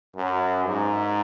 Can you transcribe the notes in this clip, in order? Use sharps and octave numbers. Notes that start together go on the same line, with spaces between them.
F#2
G#2